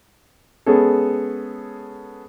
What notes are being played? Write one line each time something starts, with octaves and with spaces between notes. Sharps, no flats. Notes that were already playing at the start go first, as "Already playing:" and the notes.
G#3 B3 C#4 G#4 A4